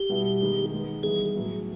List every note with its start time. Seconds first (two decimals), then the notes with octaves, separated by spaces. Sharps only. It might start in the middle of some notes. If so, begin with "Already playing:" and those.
Already playing: G4
0.09 B2 G3 B3 E4
0.41 D#3 G#3 B3
0.72 D#3 G#3 B3
1.03 E3 G3 B3 D#4 G#4
1.35 A2 F#3 B3 E4 G#4